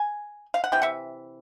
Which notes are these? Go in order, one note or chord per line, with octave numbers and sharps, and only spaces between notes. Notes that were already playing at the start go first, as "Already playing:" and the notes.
Already playing: G#5
F5
F#5
C3 E3 G5
E5 F#5